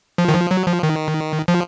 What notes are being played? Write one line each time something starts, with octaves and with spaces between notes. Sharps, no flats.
F3
D#3
F3
F#3
F3
D#3
F3